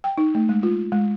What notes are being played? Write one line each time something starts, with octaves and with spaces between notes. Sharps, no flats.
G5
D#4
A3
G#3
F4
G#3